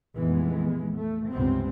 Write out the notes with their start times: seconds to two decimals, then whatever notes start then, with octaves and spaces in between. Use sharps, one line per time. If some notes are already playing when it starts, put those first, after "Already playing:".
0.17 F1 A#1 E3 G#3 B3
0.94 A3
1.29 C#2 G2 C3 B3 C4